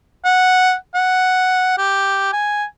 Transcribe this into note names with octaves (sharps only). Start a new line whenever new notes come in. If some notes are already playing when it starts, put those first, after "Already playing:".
F#5
F#5
G4
G#5